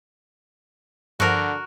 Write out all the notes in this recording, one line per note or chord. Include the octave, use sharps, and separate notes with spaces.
G2 D3 F3 F#4 A#4